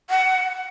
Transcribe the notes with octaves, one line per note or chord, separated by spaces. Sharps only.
F#5